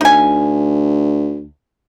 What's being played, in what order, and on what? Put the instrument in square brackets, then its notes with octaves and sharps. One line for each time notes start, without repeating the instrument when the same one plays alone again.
[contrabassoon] D2 [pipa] D#4 G#5